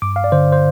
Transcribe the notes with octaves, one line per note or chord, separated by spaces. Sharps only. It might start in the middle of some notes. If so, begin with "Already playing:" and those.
G2 D6
F5
D5
D3 C5
C5